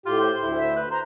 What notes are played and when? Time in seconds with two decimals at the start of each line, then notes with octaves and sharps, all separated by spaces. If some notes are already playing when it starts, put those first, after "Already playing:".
0.06 A2 F4 G4 C6
0.21 C5
0.42 D2 E4
0.57 E5
0.76 B4
0.91 C5 A#5